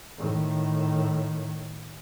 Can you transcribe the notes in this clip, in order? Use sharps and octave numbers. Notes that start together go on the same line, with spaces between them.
A2 D#3